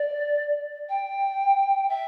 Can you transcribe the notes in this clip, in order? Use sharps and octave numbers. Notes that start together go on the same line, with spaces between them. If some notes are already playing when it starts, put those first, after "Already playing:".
Already playing: D5
G5
E5